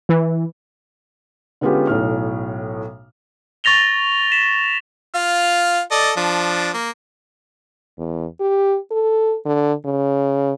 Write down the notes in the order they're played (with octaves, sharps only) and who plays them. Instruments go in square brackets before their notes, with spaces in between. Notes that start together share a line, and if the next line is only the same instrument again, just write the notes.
[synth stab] E3
[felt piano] D3 G#3 B3 C#4 F4 G4
B1 A2 F6
[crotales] C#6 A6 A#6 F7 G7
B6 E7
[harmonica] F4 F5
A4 D5 D#5
F3 D4
A#3
[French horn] E2
G4
A4
D3
C#3